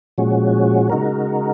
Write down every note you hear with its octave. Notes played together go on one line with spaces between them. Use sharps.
A#2 F3 G#3 C#4 F#4
C#3 G#3 D#4 F#4 A#4